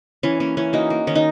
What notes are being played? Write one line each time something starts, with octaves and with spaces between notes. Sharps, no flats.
E3 C#4
A#3 C#4
E3 C#4
A#3 D#4 F#4
A#3
D#3 C#4
D#4